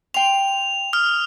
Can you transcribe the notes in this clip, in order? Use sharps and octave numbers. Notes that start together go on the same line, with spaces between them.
G5 C6 F7
D#6 F6